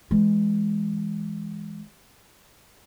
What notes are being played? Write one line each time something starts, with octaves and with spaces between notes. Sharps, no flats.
E3 G#3